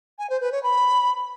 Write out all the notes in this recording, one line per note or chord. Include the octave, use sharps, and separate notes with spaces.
G#5
C5
B4
C#5
B5